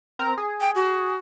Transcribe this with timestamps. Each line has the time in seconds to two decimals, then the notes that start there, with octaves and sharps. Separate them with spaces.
0.19 C4 A#4 A#5
0.38 G#4
0.61 G5
0.75 F#4